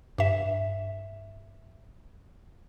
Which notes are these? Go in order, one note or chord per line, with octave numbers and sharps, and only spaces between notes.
G2 E5